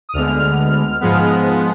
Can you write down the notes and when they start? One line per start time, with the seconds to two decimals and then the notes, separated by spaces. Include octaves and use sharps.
0.09 D#6
0.13 D2 D3 G#3 B3 F6
1.00 G#2 F3 G#3 B3